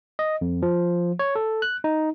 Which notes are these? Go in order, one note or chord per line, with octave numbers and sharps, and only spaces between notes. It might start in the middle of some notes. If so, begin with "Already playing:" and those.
D#5
F2
F3
C#5
A4
F#6
D#4